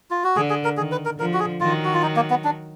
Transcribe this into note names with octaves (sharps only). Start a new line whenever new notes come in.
F4
F#4
D3 G#4
G#4
A#4
D#3 G#4
B4
A#4
D3 F3 A#4
F#4
G#4
D#3 F#3 F4
F#4
F4
D#4
A#3
B3
D4